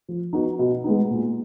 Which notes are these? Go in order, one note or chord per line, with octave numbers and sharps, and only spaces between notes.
F3
B3 D#4 F#4
B2
G#3 B3 D#4
A#2